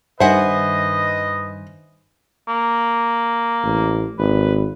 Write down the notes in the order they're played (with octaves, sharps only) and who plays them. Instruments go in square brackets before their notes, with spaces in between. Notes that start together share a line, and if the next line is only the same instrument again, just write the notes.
[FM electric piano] G2 D#3 [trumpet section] B4 D#5 [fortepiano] C5 G#5 [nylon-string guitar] E5 F#5
[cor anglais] A#3
[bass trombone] A1
[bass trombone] G#1 [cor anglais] B4